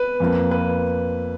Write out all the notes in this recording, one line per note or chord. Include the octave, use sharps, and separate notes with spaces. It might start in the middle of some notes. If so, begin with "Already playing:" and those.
Already playing: B4
F2 F3 A#3
B4